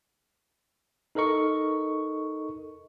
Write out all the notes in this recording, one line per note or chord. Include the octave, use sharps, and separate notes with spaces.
D#4 A4 A#4 D#5 C#6